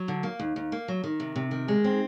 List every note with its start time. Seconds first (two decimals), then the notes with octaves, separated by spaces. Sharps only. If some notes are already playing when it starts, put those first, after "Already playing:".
Already playing: F#3
0.08 D3
0.23 A#3
0.39 D#2
0.56 D#2
0.72 A#3
0.88 F#3
1.04 D#3
1.20 C3
1.36 C3
1.51 D#3
1.68 G#3
1.84 C4